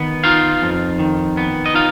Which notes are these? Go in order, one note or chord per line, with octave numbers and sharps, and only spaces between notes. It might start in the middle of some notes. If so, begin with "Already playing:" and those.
Already playing: D#3 B3
D#4 F4 F5
F2
D#3
B3
D#5
D#4 F4 F5